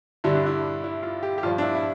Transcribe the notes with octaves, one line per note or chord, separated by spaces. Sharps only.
G2 D3 G3 E4
D4
E4
E4
F4
G4
G4
G2 F3 F4
D4
E4
E4